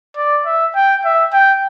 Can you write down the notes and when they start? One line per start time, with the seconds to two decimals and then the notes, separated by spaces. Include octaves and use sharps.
0.17 D5
0.46 E5
0.76 G5
1.05 E5
1.33 G5